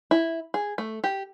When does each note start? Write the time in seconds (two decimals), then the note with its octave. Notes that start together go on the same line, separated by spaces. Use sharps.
0.11 E4
0.54 G#4
0.78 A3
1.04 G4